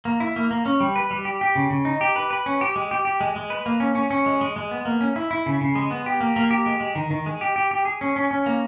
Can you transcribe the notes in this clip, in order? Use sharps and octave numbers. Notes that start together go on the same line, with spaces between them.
A#3
E4
A#3
A#3
C#4
G3
B4
G3
G4
G4
C#3
C#3
D#4
G4
B4
B4
C#4
G4
G#3
G4
G4
G#3
G#3
B4
A#3
C#4
C#4
C#4
G#3
G#3
G#3
B3
A#3
C#4
E4
E4
C#3
C#3
G#3
B3
G4
A#3
A#3
G4
G#3
G#3
D#3
D#3
G#3
G4
G4
G4
G#4
C#4
C#4
C#4
A#3